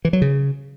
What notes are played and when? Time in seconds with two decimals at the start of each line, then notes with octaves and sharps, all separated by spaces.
0.05 E3
0.13 F#3
0.22 C#3